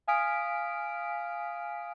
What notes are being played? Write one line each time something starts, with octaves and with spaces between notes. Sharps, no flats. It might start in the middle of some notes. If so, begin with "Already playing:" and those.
F5 G#5 D#6 F6 B6 D7